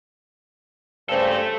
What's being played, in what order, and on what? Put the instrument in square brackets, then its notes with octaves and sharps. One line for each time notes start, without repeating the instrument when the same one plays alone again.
[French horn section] G2 C#3 C5 [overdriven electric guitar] A3 A4